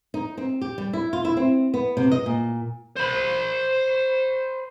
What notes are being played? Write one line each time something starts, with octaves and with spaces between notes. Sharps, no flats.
D#4
C4
G4
G3
E4
F4
E4
C4
B3
C3
D#5
A#2
C5 B5